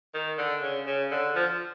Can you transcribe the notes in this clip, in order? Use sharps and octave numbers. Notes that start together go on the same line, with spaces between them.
D#3
D3
C#3
C#3
D3
F3